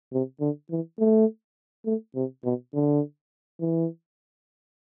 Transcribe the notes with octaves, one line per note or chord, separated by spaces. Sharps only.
C3
D3
E3
A3
A3
C3
B2
D3
E3